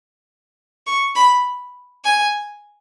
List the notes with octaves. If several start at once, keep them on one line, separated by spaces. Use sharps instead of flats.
C#6
B5
G#5